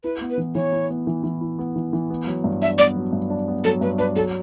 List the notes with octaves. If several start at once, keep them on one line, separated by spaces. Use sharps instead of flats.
E4 B4
B3
B4
E3
E3 C#5
E4
B3
E3
E3
E4
B3
E3
E3
B3
F#3
G2
D4 E5
B3 D5
F#3
G2
D4
B3
F#3 A4
G2 B4
D4 B4
F#3 A4